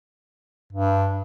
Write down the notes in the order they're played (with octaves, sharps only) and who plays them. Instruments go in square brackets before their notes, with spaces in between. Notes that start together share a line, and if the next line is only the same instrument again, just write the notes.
[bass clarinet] G2